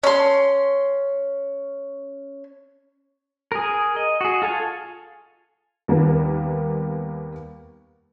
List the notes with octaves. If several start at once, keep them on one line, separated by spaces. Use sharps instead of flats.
C#4 C6
G#4 A#4
D#5
F#4 G#4
F4 A4 F5 G#5
D#2 G3 A#3 B3